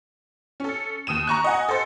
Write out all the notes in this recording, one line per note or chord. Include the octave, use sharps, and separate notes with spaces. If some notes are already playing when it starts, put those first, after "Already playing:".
C#4 A4
D#2 D#6 D#7 E7
A#5 C#6 F#6
D#5 F#5 G#5
A4 C5